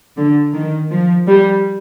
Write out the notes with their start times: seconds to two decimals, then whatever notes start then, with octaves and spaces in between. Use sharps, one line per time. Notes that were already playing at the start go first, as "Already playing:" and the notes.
0.17 D3
0.54 D#3
0.91 F3
1.28 G3